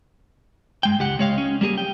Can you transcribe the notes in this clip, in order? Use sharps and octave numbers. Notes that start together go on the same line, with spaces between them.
G2 G#3 G5
C#2 G4 F#5
C#2 G#3 C#5 F5
C#4
G3 A#3 G4 G#4
G5